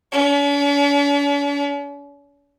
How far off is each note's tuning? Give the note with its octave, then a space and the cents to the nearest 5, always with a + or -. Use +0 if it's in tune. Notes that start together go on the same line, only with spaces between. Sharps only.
C#4 +45